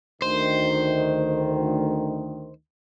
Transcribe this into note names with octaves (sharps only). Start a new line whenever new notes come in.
D2 D#3 C5